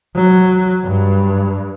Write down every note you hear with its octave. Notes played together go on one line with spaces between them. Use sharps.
F#3
G2